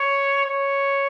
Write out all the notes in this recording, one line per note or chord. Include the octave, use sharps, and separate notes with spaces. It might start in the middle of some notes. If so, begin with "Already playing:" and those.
Already playing: C#5
C#5